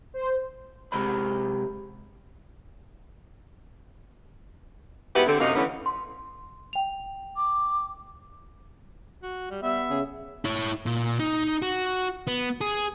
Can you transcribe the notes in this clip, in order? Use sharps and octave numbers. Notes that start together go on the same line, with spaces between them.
C5
C3 G#3 G4 A#4 C5 B5
G#2 B3 E4 G4 B4 F#5
D3 C4
F#2 C3 A#3 D#4
D3 E3 A3 B3 C#4
C6
G5 F7
D6
F#4
G3
G3 B3 E5
C#3 G#4
E4 C#5
A#2
D#4
F#4
B3
G#4